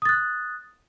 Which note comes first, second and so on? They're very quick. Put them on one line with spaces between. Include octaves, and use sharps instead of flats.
D#6 A6 F#6